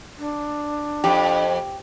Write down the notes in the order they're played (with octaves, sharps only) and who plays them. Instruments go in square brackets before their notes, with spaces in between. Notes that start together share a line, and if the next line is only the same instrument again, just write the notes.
[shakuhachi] D4
[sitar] F2 [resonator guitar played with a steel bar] G4